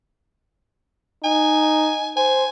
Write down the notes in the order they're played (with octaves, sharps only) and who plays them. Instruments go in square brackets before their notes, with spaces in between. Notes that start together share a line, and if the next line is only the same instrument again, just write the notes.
[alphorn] D#4 [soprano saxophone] G#5
[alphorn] C5 [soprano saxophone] G#5